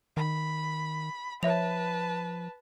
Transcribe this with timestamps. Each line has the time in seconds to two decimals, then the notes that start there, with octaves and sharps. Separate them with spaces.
0.17 D#3 B5
1.43 F3 B4 C#5 E5 A5 F7